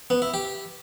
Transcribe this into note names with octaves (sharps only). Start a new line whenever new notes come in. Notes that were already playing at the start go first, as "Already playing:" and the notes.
B3
E4
G4